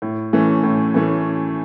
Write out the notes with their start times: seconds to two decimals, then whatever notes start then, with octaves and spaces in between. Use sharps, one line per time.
0.02 A2
0.33 E3 A3 C#4
0.63 A2
0.94 E3 A3 C#4